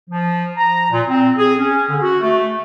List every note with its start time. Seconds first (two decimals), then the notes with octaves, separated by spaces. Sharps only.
0.10 F3
0.57 A#5
0.92 A#2
1.08 C4
1.38 G#4
1.59 C#4
1.88 D3
2.02 F#4
2.21 A3